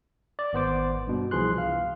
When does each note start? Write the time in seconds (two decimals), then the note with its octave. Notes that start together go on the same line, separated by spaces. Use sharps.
0.39 D5
0.53 G#1 B3 C5 D6
1.07 G2 B2
1.31 C2 E3 F3 G#4 C6 F#6
1.58 F5